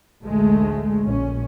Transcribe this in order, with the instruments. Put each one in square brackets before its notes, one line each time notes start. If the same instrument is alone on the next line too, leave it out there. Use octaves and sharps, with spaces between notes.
[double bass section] A1 D2 G#3 A3
A#1 C#4